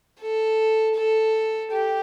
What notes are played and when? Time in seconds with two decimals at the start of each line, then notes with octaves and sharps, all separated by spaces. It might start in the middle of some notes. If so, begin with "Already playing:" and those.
0.20 A4
0.95 A4
1.71 G4